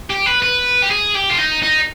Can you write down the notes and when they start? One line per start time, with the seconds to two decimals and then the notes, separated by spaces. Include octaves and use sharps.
0.10 G4
0.26 B4
0.42 B4
0.82 G4
0.90 G#4
1.15 G4
1.30 F4
1.38 D#4
1.63 D#4